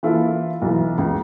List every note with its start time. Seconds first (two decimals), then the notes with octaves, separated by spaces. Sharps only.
0.03 E3 A#3 E4 F4 A4
0.62 B1 E3
0.98 C#2